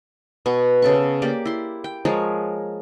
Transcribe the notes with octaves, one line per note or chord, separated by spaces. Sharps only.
B2 B3 C#6
C#3 A4 C#6
A#3 G4 D5
E4 C6
G5
F3 G#3 A#4 C#5